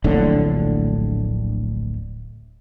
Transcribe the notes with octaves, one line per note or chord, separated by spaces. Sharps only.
D1 A#1 A2 D3